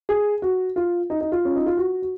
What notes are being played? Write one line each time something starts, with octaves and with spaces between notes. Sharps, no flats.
G#4
F#4
F4
D#4
D#4
F4
C#4
D#4
F4
F#4
F#4